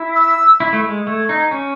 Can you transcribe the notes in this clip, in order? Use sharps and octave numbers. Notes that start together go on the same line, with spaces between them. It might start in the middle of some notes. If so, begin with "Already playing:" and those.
Already playing: E4
E6
E4
A3
G#3
A3 G#6
D#4
C#4